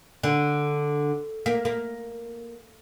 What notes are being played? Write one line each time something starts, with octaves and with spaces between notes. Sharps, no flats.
D3
A#3
A#3